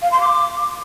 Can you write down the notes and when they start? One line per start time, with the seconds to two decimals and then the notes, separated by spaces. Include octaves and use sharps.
0.02 F5
0.11 C6
0.21 D6